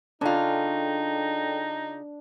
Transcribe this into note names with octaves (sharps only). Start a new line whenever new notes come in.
C#3 D4 D#4 F4 A4 D5 G5